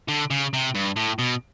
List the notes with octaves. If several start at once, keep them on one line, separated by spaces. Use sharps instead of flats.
D3
C#3
C3
G2
A2
B2